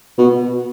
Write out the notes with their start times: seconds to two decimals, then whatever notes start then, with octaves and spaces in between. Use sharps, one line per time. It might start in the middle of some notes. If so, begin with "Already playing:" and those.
0.18 B2